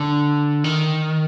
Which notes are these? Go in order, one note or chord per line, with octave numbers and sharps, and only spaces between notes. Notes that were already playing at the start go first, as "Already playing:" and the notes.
Already playing: D3
D#3